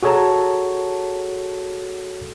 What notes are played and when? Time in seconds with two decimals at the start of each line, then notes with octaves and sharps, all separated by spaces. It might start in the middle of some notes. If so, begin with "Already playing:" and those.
0.03 F#4 G#4 A4 C#5 A5 A#5